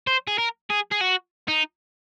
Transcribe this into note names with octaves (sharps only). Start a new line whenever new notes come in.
C5
G#4
A#4
G#4
G#4
F#4
D#4